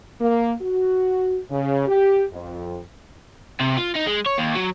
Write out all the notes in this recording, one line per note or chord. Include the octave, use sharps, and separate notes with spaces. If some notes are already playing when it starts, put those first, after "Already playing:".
A#3
F#4
C#3
G4
F2
C3
F4
D#4
G#3
C#5
D#2
F#3